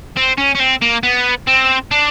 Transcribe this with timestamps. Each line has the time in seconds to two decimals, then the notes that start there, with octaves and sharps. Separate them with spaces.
0.17 C4
0.38 C#4
0.55 C#4
0.60 C4
0.82 A#3
1.03 B3
1.47 C4
1.91 D4